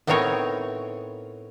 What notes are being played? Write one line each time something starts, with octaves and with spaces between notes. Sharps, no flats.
A2 B3 C4 D#4 A#4 C#5